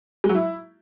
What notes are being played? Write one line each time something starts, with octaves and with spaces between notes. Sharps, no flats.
G#3
F#3
E4